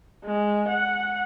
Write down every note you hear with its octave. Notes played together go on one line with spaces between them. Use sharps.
G#3
F#5